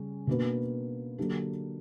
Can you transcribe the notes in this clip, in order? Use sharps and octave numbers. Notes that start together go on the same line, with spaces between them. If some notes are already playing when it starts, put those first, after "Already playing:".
Already playing: C#3 G3 C#4
B2 A#3 D4 F#4 B4
D3 F#3 A#3 D4 G4